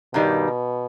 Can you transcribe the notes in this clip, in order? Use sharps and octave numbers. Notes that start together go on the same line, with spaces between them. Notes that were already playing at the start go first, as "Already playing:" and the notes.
G2 B2 D#3 G3